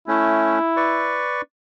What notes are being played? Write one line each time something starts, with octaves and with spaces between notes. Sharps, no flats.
A3 C#4 E4
B4 D5 C#6